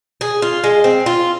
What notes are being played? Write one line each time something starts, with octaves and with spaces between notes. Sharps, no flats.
G#4
F4
G#3
C4
F4